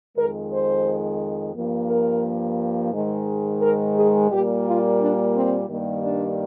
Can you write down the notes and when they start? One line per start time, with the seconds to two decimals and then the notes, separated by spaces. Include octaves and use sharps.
0.16 F2 D#3 G#3 A#4
0.50 C5
1.54 G2 F3 A#3
1.89 A#4
2.92 G#2 D#3 G#3
3.61 A#4
3.95 G#4
4.30 A#2 G3 A#3 G4
4.65 F4
4.98 D4
5.34 C4
5.68 G2 D#3 G3 A#3
6.03 D4